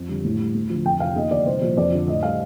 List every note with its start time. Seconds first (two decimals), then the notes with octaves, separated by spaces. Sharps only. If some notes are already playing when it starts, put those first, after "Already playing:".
Already playing: F2
0.09 D3 G3
0.24 A2
0.39 G3
0.54 D2
0.70 D3 F3
0.85 F2 G5
1.00 C3 F3 F5
1.16 D#2 D#5
1.31 D3 F3 D5
1.46 C2 C5
1.61 A#2 F3
1.77 F2 D5
1.92 D3 F3
2.07 A2 D#5
2.22 G3 F5